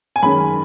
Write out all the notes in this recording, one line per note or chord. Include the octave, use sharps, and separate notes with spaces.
G#5
F#2 D#3 G#3 C#4 B5